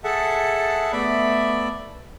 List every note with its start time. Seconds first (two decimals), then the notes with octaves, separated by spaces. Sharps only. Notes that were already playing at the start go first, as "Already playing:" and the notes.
0.04 G#4 A4 E5 F#5 A5
0.92 A3 B3 D5 E5 B5